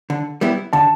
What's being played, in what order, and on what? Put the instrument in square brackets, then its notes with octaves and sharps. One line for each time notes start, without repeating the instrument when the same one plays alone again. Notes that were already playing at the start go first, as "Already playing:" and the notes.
[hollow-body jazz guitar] D3
G3 B3 E4
[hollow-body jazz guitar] D3 [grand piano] A5